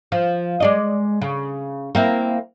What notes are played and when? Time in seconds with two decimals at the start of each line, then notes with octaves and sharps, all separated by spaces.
0.12 F3
0.60 G#3 D5 D#5
1.21 C#3
1.95 A#3 C4 E4